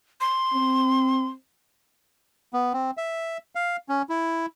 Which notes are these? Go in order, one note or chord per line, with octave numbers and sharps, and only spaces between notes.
C6
C4
B3
C4
E5
F5
C#4
E4